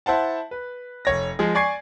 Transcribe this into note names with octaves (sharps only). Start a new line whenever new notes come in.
E4 C5 F#5 A5
B4
F1 C#5 A#6
F3 G#3 G#4
D5 G#5 C#6 G#6 C7